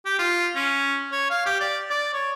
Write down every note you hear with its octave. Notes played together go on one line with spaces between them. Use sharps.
G4
F4
C#4
C#5
F5
G4
D5
D5
C#5